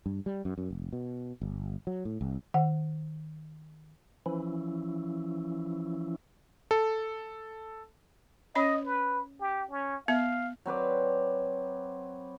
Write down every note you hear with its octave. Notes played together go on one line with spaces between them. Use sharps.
G2
G3
F#2
F#2
F1
B2
G1
F#3
A2
C2
D#3 F#5
E3 F3 C#4 E4
A4
C#4 C#5 D#5 B5
B4
G4
C#4
B3 E5 F5
F#3 C4 B4 D5